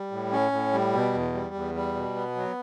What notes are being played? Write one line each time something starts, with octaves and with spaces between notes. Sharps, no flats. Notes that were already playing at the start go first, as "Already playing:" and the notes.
Already playing: G3
A2
C#4
A2
G3
B2
E2
G3
E2
G3
B2
B3
F#3